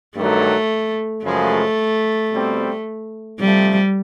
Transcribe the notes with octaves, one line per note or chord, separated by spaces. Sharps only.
G2 D#3 F#3 A3
F#2 C#3 F3 G#3 A3
B2 G3 C4
C3 F3 G3 A3